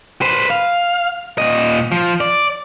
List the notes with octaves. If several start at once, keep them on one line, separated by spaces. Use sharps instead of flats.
B4 C5
F5
A#2 D#5
F3
D5